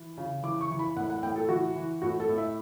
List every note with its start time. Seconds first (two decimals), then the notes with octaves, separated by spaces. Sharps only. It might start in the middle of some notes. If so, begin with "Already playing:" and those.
Already playing: E3
0.18 C#3
0.43 E3 D6
0.61 C#6
0.70 E3
0.79 B5
0.96 A2 F#5
1.10 F#5
1.23 A2 G5
1.36 A4
1.49 E3 F#4
1.76 E3
2.02 A2 F#4
2.20 A4
2.29 A2
2.38 E5